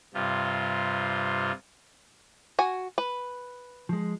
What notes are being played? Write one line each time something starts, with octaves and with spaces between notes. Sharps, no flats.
G2 C3 F4
F#4 G#5
B4
F3 G#3